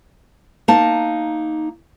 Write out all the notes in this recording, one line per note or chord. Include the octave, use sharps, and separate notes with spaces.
A#3 D#4 A5